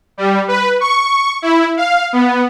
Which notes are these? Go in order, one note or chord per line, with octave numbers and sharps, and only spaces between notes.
G3
B4
C#6
E4
F5
B3